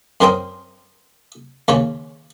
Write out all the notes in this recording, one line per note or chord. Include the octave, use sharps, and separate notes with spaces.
F#2 C4 A#4 C5 G5 D#6
D#2 C#3 C#5 G#5